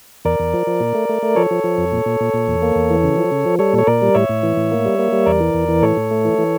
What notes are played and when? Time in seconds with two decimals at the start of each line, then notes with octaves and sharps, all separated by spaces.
0.25 E2 A#4 D5
0.40 E2
0.53 F3
0.67 F3
0.80 A#2
0.95 A3
1.09 A3
1.23 A3
1.36 F3 A4 C#5
1.51 F3
1.64 F3
1.78 F2
1.92 A#2
2.06 A#2
2.20 A#2
2.34 A#2
2.47 E2
2.62 A#3
2.75 E2
2.90 E3
3.03 C#3
3.18 F3
3.32 C#3
3.46 F3
3.59 G3 A4 C#5
3.73 A#2
3.78 C#5
3.87 A#2 A#4 D5
4.02 G3
4.15 A2 C#5 E5
4.29 A2
4.43 E3
4.57 A2
4.71 A#3
4.85 G3
4.99 A#3
5.12 G3
5.26 E2 A#4 D5
5.40 E3
5.54 E2
5.69 E3
5.83 A2 A4 C#5
5.97 A2
6.11 A3
6.25 E3
6.38 E3